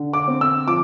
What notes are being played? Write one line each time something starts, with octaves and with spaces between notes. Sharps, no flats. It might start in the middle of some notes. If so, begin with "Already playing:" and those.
Already playing: D3
D6
C4
E6
F3 D6